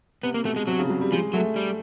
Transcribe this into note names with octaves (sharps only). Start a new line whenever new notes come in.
C3 B3
A#3
B2 A3
G#3
C3 F#3
C#3
F#3
G3
F3 G#3
F#3 A3
G3